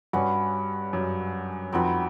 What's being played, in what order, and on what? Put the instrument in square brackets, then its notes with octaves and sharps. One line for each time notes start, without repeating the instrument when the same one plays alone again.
[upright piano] G2 [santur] C#4 F#4 B4
[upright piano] F#2
[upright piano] F2 [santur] C4 D#4 F#4 B4